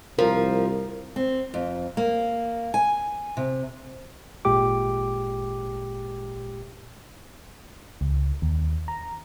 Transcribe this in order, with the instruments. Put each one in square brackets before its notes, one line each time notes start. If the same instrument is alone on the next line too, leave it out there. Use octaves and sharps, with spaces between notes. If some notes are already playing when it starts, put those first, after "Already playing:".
[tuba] C2 [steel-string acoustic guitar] F3 [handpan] A#4
[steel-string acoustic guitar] C4
F2
A#3
G#5
C3
[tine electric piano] G#1 A#2 G#3 G4 D6
[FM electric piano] C#2
D#2
A#5